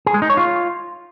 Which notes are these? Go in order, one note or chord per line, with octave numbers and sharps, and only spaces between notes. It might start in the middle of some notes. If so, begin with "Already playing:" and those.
G#4
G#3
D#4
C#5
F4